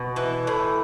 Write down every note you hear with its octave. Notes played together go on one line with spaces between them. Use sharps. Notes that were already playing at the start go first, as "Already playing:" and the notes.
Already playing: B2
E3
A2